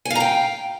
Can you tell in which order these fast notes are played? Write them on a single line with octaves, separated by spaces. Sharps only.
G#5 F5 A#5 G5